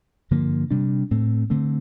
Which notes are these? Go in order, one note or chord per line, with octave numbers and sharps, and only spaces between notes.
G2 D3 F3 A#3
C3 G3 D4
A2 A3 C4
D3 A3 C4